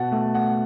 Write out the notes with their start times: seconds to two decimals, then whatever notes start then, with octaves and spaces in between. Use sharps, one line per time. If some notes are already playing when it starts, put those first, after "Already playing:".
Already playing: B2 F#5 A5
0.12 A3
0.34 F#5